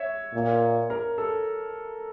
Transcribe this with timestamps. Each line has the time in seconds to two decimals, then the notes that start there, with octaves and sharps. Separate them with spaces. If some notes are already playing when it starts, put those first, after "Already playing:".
Already playing: C#5 E5
0.33 A#2
0.90 A#4
1.18 A4